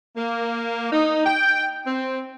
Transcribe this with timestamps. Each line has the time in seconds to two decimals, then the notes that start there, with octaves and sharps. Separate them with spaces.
0.17 A#3
0.93 D#4
1.26 G5
1.87 C4